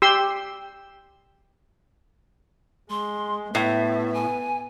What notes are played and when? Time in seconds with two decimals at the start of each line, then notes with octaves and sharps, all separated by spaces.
0.02 G4 C6 E6
2.90 G#3 C6
3.55 A2 B3 E5
4.14 G#5